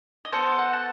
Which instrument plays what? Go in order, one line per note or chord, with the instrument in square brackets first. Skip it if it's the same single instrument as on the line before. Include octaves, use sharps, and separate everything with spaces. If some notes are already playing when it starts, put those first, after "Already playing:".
[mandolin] D#5
B3 F#4 A4 C5
F#5
A5